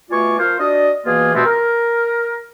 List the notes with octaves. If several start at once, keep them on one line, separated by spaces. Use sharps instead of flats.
B2 A3 F4 D5 G#5 C#6
F3 F4 A#4 C5 F5
D4 F#4 D5 D#5
B2 E3 A#3 F4 G#4
G2 B2 A3 B3 C4
A#4